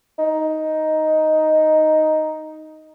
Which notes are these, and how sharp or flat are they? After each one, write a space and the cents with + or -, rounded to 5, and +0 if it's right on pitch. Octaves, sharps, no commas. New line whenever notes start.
D#4 +5